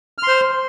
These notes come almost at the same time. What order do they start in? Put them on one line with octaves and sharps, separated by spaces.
F6 C6 C5